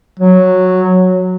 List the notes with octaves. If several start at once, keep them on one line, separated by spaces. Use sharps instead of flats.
F#3